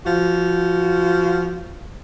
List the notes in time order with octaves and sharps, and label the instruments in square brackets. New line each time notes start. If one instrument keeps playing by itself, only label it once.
[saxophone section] F3 F#4